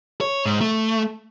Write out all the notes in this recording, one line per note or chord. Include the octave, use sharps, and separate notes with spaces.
C#5
G#2
A3